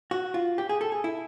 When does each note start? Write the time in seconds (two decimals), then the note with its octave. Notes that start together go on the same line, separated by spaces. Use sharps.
0.11 F#4
0.34 F4
0.58 G4
0.69 G#4
0.81 A4
0.92 G#4
1.04 E4